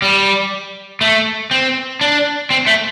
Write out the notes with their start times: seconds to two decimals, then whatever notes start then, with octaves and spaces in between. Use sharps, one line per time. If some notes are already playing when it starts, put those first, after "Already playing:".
0.02 G3
1.01 A3
1.51 C4
2.01 D4
2.50 C4
2.67 A3